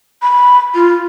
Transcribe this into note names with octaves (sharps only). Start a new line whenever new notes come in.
B5
F4